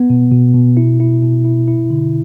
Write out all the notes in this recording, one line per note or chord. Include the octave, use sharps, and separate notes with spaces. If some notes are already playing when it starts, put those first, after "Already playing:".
Already playing: B3
B2
B2
B2
E4
E4
B2
E4
E4
D3